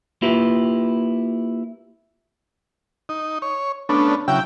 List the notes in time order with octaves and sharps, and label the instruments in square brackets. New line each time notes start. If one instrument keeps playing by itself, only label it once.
[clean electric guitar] A#3 E4 F4 G4 B4
[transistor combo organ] D#4
C#5
[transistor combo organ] A3 B3 C#4 [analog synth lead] D4
[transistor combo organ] C#3 F#3 E4 [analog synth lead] G5